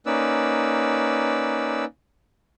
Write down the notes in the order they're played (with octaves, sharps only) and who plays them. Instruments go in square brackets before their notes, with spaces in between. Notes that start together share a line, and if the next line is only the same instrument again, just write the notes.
[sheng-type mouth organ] A#3 C#4 D#4 B4 D5 E6